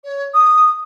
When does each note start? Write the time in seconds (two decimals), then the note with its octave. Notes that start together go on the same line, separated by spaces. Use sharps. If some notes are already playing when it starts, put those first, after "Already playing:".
0.04 C#5
0.34 D#6